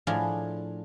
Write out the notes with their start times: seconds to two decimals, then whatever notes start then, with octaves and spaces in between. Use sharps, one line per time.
0.07 A2 F3 D4 G#4 F5